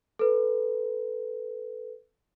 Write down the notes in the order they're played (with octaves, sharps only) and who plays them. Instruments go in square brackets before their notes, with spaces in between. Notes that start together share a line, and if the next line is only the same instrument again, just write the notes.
[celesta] A4 B4